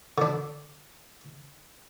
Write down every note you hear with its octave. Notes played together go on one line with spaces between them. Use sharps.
D3 D4